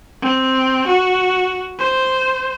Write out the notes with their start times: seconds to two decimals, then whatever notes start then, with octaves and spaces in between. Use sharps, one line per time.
0.22 C4
0.87 F#4
1.79 C5